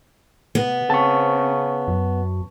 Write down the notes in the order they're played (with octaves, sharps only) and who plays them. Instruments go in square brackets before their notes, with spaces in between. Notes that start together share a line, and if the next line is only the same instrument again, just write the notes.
[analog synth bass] C3 [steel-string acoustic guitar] B3
[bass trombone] C#3 [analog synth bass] C4 [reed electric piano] A5 C#6
[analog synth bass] F#2